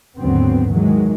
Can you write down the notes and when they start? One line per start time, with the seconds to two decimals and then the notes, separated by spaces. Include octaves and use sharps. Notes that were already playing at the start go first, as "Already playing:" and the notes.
0.17 D#2 G#2 D3 F#3 B3 C4
0.73 D#3 E3 F#3 G#3